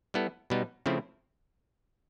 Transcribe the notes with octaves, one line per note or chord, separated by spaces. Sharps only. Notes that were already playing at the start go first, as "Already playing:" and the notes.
G3 B3 E4 A4
B2 G3 B3 D#4
C#3 F3 A3 C4 E4